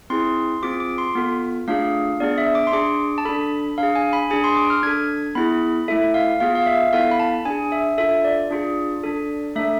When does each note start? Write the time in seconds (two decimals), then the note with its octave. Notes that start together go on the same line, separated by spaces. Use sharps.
0.10 C4 E4 G#4 C6
0.62 C4 F4 G#4 D6
0.80 D6
0.98 C6
1.15 B3 F4 A4
1.68 A3 D4 F4 G#4 F5
2.20 B3 D4 G#4 D5
2.38 E5
2.55 D6
2.67 C6
2.72 D4 G#4 D6
3.18 A5
3.25 D4 A4 B5
3.78 D4 G#4 F5
3.95 G#5
4.13 B5
4.30 D4 G#4 G#5
4.44 C6
4.57 D6
4.70 F6
4.83 D4 A4 G#6
5.35 B3 E4 G#4 B5
5.88 A3 E4 A4 E5
6.14 F5
6.40 B3 F4 G#4 F5
6.55 F5
6.67 E5
6.93 B3 E4 A4 F5
7.11 B5
7.20 A5
7.45 D4 G#4 G#5
7.72 E5
7.98 D4 F4 A4 E5
8.24 D5
8.50 D4 F4 G#4
9.03 D4 A4
9.56 A3 D4 A4 E5